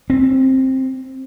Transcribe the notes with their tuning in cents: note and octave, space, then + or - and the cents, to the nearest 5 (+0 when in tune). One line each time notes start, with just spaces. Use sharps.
C4 +10